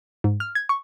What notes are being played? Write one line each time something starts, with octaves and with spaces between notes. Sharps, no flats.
G#2
F6
G#6
C#6